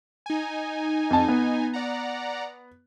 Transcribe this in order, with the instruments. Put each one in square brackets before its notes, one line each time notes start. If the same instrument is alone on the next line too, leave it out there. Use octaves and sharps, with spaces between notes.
[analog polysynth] D#4 G#5
[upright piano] F2 A5
B3
[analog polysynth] D5 F#5 A#5